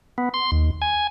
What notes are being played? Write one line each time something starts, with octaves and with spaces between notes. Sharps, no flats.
B3
C6
D#2
G#5